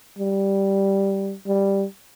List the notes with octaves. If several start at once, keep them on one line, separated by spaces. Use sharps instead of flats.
G3
G3